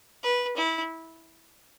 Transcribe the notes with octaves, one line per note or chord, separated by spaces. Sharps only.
B4
E4